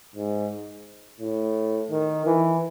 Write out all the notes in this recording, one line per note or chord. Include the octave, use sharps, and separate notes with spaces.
G#2
A2
D#3
E3